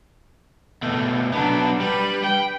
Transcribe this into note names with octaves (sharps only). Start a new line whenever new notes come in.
B2 A3
F#3 B3 D4
G3 B4
G5